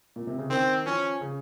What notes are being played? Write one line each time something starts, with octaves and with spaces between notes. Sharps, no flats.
A#2
C3
C#3
D#3 C4
F3 C#4
C#3